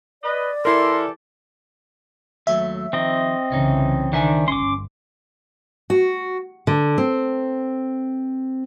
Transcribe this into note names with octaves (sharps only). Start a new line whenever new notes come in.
B4 D5 D#5
E3 E4 G4 A4 A#4 C6
D#2 F#3 A3 E5
D#3 F3 C4 D#5
C2 C#3 E3 C#4 D#4
D#3 D4 C5 E5 G#5
G1 C#4 C6 D6
F#4
D3
C4